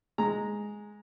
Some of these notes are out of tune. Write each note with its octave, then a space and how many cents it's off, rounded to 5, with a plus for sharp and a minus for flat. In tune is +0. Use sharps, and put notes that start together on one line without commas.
G#3 +0 A#5 +0